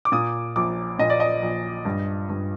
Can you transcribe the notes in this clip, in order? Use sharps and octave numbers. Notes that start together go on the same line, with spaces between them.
D6
A#2 D#6
A#1 D6
A#2 D#5
D5
D#5
A#1
G2
G2